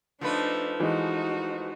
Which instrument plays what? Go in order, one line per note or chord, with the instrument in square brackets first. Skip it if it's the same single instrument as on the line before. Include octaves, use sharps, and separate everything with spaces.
[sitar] F3 A3 B4 [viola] D4 D#4
[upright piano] E3 G#3 [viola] D#4 F#4